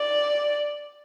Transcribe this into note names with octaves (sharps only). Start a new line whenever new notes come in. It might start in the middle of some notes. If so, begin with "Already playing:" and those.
Already playing: D5